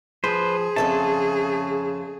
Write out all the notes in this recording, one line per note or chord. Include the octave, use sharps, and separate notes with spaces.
F3 G#4 B4 C5
F2 C#3 A4 E5 A5